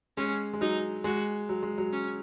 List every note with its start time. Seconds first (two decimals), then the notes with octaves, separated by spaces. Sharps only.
0.17 G#3 C#4
0.53 G#3
0.61 F#3 D#4
1.04 G#3 F#4
1.49 F#3
1.63 G#3
1.78 F#3
1.93 C#4